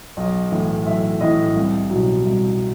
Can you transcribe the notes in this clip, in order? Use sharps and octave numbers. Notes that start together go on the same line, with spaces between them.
B1 D#5
A2 E3
B1 E5
A2 E3 D#5
C2
B2 F#3
C2